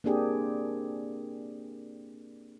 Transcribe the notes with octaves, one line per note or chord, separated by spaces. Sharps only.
A#3 C4 D4 G4 G#4